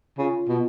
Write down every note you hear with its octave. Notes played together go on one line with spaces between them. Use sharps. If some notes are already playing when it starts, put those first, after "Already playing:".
C#3 F4
B2